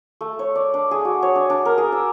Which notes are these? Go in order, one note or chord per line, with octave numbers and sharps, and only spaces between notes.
A3
C#5
D5
D4
G#4
F#4
C#5
D4
D4
A#4
G#4
E6